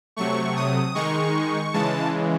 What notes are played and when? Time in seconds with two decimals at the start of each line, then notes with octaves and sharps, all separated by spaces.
0.16 C3 F#3 A3 C#6
0.56 D#6
0.95 D#3 G#3 D#4 C#6
1.73 C#3 E3 G#3 A5